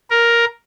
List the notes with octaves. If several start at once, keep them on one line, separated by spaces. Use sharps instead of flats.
A#4